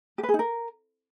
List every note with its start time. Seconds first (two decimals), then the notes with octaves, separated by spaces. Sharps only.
0.18 G4
0.23 B4
0.29 G#4
0.34 D#4
0.39 A#4